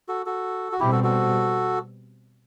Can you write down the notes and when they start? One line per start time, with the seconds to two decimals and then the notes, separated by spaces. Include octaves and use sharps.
0.08 F#4 A4
0.26 F#4 A4
0.72 F#4
0.80 B2 G3 C4 E4 G4
0.92 F#4 A4
1.04 F#4 A4